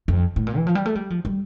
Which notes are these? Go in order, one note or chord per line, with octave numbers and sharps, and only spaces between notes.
F2
A2
A#2
E3
F3
G3
A3
G3
F3
G3